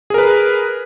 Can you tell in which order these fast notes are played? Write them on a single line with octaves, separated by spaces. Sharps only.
G#4 A#4 B4